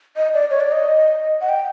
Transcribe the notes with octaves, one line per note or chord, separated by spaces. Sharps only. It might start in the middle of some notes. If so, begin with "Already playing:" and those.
D#5
D5
C#5
D5
D#5
F#5
G5